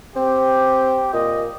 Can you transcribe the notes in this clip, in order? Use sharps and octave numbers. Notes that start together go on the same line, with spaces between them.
C4 G4
A#2 D#5